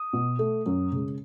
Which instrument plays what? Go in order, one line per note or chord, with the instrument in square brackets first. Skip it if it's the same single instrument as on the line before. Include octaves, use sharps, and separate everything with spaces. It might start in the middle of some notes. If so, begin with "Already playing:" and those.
Already playing: [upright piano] D#6
B2
A3
F#2
C#3 G#3